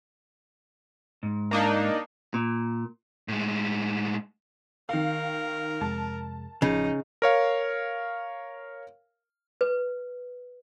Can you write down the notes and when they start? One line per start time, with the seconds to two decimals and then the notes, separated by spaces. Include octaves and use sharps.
1.23 G#2
1.51 A#3 D4 D#4
2.34 A#2
3.28 A2 G#3
4.89 D#3 A#4 F5
5.81 F2 C3 G#3 A5
6.62 A1 C#3 F3 D#4
7.22 A#4 C#5 F5
9.61 B4